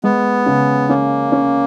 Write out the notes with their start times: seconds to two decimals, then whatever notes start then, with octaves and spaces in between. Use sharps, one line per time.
0.04 G#3 B3
0.46 C#3
0.89 A#3 C#4
1.32 C#4